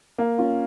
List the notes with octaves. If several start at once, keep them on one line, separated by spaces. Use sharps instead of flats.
A#3
C#4 F4